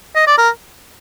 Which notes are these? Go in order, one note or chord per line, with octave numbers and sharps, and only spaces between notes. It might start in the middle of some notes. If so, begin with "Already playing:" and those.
D#5
D5
A#4